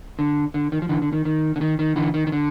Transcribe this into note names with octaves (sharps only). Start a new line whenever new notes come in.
D3
D3
D#3
F3
D3 E3
D3
D#3
D#3
D3
D#3
D#3
D3 E3
D#3
D#3
D3